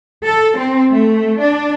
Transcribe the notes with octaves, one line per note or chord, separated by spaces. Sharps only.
A4
C4
A3
D4